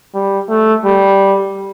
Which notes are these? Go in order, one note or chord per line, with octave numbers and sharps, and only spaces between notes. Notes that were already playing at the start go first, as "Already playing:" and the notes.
G3
A3
G3